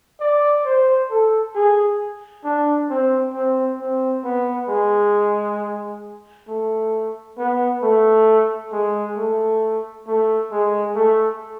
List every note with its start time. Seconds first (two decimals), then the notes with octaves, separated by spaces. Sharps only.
0.20 D5
0.65 C5
1.10 A4
1.55 G#4
2.44 D4
2.90 C4
3.34 C4
3.80 C4
4.24 B3
4.69 G#3
6.48 A3
7.38 B3
7.82 A3
8.72 G#3
9.16 A3
10.07 A3
10.51 G#3
10.96 A3